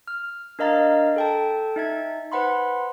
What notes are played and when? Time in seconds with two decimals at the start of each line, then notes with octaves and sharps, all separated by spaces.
0.08 F6
0.59 D4 A#4 D#5 F5 A#5 A6
1.16 A4 G5 A5
1.76 D#4 E5 G#6
2.32 B4 C5 F#5 B5 C6